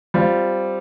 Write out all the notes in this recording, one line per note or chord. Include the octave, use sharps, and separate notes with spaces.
G3 C4 F4